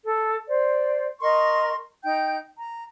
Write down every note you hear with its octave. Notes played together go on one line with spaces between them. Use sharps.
A4
C5 D5
A#4 D#5 C6 C#6
D#4 G5 G6
A#5